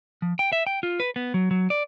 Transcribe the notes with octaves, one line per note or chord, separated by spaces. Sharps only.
F3
G5
E5
G5
F4
B4
B3
F#3
F#3
D5